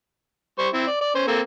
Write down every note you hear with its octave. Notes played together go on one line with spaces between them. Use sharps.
G3 C5 C#6
C4 E4
D5
D5
C#4 C5
A#3 C4 A4